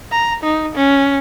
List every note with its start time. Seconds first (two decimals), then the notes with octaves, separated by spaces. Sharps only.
0.12 A#5
0.43 D#4
0.75 C#4